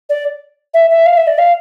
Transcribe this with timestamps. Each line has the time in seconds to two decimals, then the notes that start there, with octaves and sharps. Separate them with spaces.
0.09 D5
0.74 E5
0.90 E5
1.06 F5
1.17 E5
1.27 D5
1.38 F5